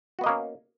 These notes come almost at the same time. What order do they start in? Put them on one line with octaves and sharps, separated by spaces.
F#4 B3 D#5 A#3 C#4